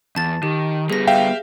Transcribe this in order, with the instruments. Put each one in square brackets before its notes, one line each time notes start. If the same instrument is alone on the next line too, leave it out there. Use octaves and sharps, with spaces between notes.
[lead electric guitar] E2 [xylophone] A5 A6
[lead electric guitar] D#3 [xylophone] G4
[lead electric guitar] G3 B3 [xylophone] G#4 A#6
[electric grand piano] E5 F5 G5